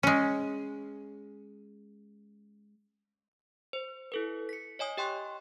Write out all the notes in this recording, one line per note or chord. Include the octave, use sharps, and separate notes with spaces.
G#3 C#4
C5
E4 A4 B4
B6 C#7
C#5 D#5 G#5 D#6
G4 D#5 G5 C6 C#6 F#6